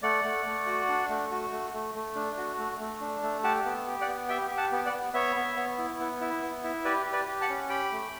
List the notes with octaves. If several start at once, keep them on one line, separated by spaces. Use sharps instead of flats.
A3 D5 F#5
A3
A3
F#4
D4
A3
F#4
A3
A3
A3
D4
F#4
A3
A3
D4
A3
G4 F#5 A5
B3
G4
D5 F#5
B3
G4 E5 G5
G4
F#5 A5
B3
D5 F#5
B3
B3 C#5 E5
B3
B3
E4
B3
E4
B3
E4
G4 B4 D5
G4
B4 D5
G4
F#5 A5
C#4
G4 G5 B5
A3